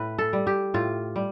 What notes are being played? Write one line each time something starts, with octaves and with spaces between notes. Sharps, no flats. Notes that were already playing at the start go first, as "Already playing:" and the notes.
Already playing: A2 B4
A4
G3
G4
A2 F4
G3